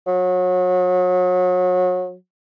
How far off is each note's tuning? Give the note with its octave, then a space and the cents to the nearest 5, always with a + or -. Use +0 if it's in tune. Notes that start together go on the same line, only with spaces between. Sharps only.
F#3 -30